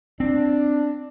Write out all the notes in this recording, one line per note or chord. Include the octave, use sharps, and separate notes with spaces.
C4 D4